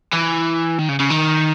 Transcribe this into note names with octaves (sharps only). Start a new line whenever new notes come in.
E3
D#3
C#3
C#3
D#3